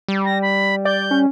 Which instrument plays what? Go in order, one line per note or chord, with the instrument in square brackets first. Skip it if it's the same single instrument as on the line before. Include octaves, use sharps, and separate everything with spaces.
[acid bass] G3
[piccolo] A#6
B5
[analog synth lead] D5 [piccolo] G6
[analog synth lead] C#4